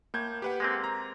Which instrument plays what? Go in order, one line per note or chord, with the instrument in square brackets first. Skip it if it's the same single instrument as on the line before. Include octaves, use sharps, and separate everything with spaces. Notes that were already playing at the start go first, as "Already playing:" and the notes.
[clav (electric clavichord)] A2 [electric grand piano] A#3 G6 G#6
[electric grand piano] G4 B4 F#5
[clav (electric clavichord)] G#3 A#3 C4
[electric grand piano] A#5